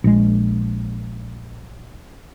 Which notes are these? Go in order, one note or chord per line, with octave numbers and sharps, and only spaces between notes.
A#1 G#3